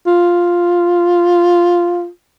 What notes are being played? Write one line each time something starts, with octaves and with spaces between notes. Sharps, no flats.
F4